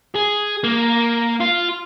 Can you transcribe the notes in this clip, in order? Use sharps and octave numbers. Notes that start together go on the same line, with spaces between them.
G#4
A#3
F4